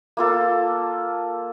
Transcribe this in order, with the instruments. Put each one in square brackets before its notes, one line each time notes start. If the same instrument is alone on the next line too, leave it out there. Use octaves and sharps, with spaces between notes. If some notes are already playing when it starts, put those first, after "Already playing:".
[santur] A#3 F4 A4